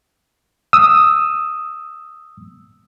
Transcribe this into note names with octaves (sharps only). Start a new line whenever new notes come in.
D#6 E6